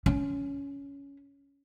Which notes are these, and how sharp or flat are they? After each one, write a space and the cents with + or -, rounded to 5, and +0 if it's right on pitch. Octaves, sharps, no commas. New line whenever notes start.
C#4 +15